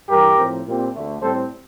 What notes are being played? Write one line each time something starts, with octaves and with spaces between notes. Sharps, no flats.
G2 E3 G3 G4 A#4
A2 F3 C4
A#2 G3 C4
D2 D3 A3
A2 G3 C4 A4 C5